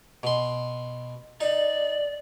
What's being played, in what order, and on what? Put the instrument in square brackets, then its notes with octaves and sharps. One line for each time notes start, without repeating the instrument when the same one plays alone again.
[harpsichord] B2 C6
[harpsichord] D#4 [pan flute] D5